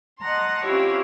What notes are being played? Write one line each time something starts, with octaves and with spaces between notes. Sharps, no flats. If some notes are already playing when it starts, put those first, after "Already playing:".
D#5 F#5 A5 A#5 C6
C4 C#4 E4 F4 G4 C#5